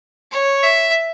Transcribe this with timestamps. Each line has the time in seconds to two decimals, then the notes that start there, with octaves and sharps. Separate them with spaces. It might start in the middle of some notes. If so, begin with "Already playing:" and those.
0.32 C#5
0.63 E5